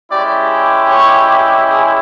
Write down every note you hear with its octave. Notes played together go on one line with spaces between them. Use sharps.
G#3 C#4 E4 G4 D5
C#5
G#4